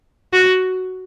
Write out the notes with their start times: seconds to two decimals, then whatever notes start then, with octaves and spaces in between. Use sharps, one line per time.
0.33 F#4